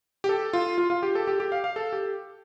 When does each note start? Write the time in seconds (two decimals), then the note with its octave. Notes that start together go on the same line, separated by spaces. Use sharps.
0.24 G4
0.29 A4
0.53 F4
0.78 F4
0.90 F4
1.03 G4
1.15 A4
1.27 G4
1.40 G4
1.52 F5
1.64 F5
1.76 A4
1.92 G4